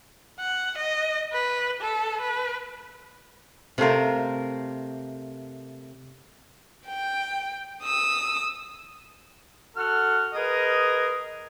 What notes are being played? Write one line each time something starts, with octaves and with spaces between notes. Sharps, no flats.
F#5
D#5
B4
A4
B4
C3 A3 F4 A#4
G5
D#6 E6
F#4 A4 F#5 F6
G#4 A#4 B4 D#5